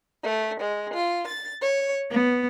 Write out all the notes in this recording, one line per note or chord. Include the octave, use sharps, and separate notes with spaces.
A3
G#3
F4
A6
C#5
B3